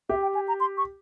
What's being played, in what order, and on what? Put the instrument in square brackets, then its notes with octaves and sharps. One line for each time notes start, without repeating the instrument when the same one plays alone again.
[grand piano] G4 [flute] E5
[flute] G5
G#5
A#5
C6
C#6